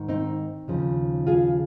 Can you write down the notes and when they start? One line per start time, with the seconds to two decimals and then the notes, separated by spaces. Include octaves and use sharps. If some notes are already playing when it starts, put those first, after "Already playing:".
Already playing: G#2 D#3
0.09 C4 D#4
0.68 D#2 C#3 F3
1.27 F4 G#4